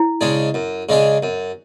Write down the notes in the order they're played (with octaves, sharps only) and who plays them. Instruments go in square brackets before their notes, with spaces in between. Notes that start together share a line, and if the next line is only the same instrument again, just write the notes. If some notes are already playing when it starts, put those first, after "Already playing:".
Already playing: [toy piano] E4
[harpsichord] C#3 G#3 D4 G#4
F#2
C#3 G#3 D4 G#4
F#2